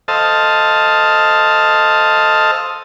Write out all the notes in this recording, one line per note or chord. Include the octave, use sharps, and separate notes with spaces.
A4 C5 D#5 F5 A5